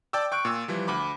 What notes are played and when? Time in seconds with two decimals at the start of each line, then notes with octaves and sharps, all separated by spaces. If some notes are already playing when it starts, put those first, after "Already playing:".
0.13 D5 G5 A5 D6 E6
0.32 G5 C#6 F#6 D7
0.45 A#2 E6
0.68 E3 F3 G3
0.88 D2 B5 D6